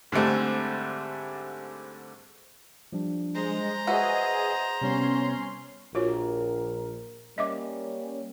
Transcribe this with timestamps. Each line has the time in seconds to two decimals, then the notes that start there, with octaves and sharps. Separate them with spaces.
0.12 G#2 D3 G3 A3 C4
2.92 F3 G3 D4
3.35 G#3 C5 A#5
3.87 F#4 G#4 B4 D#5 E5
4.81 C3 G3 B3 C#4 C6
5.95 A#1 F4 F#4 A#4 C#5
7.38 G3 A#3 C#4 D#5 E5 D6